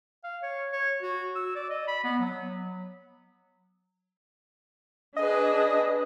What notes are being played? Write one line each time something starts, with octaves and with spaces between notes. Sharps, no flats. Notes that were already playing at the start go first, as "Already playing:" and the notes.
F5
C#5
C#5
F#4
E6
D5
D#5
B5
B3
F#3
D4 G#4 B4 D#5